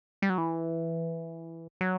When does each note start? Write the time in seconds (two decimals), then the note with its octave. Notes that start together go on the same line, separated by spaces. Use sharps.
0.22 G3
0.30 F#3
0.38 E3
1.81 F#3